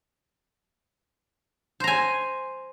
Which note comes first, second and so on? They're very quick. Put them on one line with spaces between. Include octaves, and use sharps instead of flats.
C5 A#5 G#5